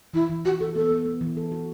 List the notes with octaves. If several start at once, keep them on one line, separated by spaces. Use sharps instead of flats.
E3 E4
E3
E3 F#4
E3 A4
B3 A4
B3
B3
E3
A4
F#4